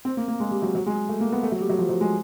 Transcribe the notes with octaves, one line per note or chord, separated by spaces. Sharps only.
C4
A#3
A#3
G#3
G3
F#3
F#3
G#3
A3
A#3
B3
A3
F#3
G3
F#3
F3
F#3
G#3